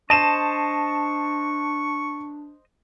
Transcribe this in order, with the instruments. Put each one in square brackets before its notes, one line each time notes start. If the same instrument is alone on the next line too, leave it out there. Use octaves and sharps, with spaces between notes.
[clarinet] D4 [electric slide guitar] C5 D#5 [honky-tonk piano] A5 E7 [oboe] C#6